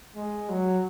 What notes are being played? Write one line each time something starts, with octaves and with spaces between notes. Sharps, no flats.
G#3
F#3